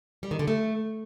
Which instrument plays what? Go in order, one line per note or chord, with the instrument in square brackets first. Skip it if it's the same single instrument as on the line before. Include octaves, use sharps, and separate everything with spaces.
[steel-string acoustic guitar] G3
D#3
D3
A3